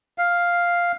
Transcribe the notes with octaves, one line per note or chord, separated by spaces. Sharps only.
F5